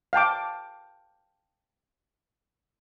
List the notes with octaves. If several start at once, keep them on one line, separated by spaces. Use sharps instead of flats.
F5 G5 A5 D6